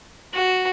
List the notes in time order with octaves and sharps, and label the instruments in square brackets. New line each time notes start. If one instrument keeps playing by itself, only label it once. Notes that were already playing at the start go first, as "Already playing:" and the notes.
[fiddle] F#4